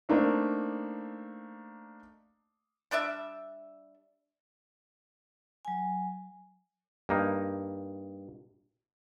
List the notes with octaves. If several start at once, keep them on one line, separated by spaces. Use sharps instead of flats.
A3 A#3 C4 D4 D#4
G3 D4 D5 E5
F#3 G#5
G2 A#3 D#4